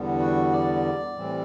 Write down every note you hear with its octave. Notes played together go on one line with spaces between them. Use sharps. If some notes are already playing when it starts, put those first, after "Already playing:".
Already playing: E2 D3 G3 B3
F#4
D5
A2 E3 G3 C4